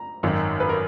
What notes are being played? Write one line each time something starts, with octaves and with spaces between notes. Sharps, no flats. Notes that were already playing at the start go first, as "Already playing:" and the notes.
Already playing: A#5
G#1 F#2 D#3
B4
A#4